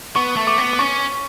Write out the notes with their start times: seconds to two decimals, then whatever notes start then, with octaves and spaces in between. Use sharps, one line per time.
0.16 B3 C#6
0.36 A3
0.47 D6
0.58 B3
0.73 D6
0.79 C#4 C#6